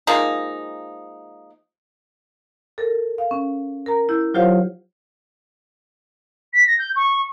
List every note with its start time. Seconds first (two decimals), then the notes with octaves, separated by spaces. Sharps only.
0.07 F3 G#3 A#3 D#4
2.78 A4 A#4
3.18 F5
3.31 C#4
3.86 A#4 A#5
4.09 E4 G6
4.34 F#3 F4 G4 C5 C#5 F5
6.53 B6
6.66 A#6
6.78 G6
6.95 C#6